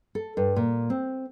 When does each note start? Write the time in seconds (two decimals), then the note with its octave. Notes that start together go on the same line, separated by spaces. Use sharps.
0.15 A4
0.37 G2
0.56 A#2
0.90 C4